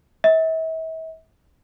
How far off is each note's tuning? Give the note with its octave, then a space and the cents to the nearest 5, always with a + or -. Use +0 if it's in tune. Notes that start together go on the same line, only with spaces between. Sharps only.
E5 -40